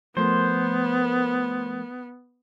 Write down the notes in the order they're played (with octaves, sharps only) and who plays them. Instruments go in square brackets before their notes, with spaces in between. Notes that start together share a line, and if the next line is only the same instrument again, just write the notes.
[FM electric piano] F3 A3 A#4 [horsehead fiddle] B3 [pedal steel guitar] C5